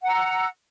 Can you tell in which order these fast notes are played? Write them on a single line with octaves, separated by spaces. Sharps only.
F#5 A#5 E6